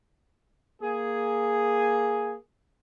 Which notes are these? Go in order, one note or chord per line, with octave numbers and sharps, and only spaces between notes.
A#3 G#4